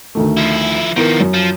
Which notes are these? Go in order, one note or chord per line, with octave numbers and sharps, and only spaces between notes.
D2 D#3 A3
F3 E4
D#3 F3 B3 E4 A#4
F#2
F3